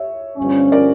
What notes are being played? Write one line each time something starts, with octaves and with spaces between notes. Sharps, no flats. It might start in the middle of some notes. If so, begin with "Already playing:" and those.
Already playing: C#5 E5
G1 G2 F3 C#4
A#4 D5